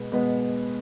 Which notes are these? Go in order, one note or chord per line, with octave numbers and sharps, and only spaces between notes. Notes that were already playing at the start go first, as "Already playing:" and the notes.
Already playing: B2 G#3 B3
B2 G#3 B3